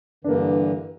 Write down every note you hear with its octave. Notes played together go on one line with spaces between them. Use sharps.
G2 D3 E3 A#3 D4